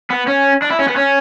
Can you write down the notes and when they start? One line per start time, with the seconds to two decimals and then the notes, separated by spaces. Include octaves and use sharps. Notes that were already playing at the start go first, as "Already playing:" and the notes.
0.10 B3
0.27 C#4
0.62 D4
0.70 E4
0.79 C#4
0.88 B3
0.96 C#4